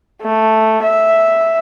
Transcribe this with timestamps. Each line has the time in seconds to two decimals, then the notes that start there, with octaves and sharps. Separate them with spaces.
0.22 A3
0.82 E5